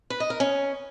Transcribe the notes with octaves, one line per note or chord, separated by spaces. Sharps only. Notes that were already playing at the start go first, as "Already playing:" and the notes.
B4
D#5
A#4
C#4